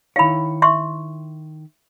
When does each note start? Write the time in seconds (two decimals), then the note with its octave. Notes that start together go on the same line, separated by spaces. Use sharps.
0.16 D#3 E4 C#5 F5 B5
0.62 E5 C6 C#6